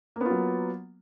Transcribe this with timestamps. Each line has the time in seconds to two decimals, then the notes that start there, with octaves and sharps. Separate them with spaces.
0.16 A#3
0.21 B3
0.25 F4
0.30 F#3